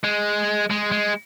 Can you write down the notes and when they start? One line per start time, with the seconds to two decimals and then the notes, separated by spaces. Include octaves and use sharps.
0.04 G#3
0.70 G#3
0.91 G#3